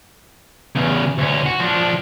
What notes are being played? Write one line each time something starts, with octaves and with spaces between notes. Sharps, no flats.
E2 C#3
D2 C#4
F#4
F3 D4